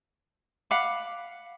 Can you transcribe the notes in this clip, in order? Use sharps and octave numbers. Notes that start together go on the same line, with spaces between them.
F5 F#5 B5 D6